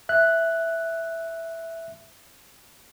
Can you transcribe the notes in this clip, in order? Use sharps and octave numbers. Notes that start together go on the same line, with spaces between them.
E5 F#6